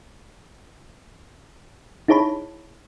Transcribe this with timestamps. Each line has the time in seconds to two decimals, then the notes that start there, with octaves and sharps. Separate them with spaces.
2.08 D#4 E4 G#4 C#5 A5 B5